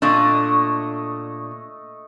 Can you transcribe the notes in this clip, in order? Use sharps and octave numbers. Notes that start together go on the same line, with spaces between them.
A#2 A3 D4 D#5